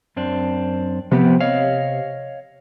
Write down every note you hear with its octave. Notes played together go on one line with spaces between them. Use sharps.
F#2 C4 D4
C3 F3 B3 G4
C#5 D#5 F5